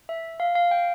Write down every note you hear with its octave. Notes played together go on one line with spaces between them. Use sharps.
E5
F5
F5
G5